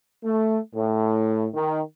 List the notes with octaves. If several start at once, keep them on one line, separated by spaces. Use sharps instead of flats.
A3
A2
D#3